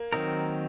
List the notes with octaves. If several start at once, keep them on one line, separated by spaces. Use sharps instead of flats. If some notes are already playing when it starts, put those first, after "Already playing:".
Already playing: A#3
D#3 F#3 C4 D#4 A#4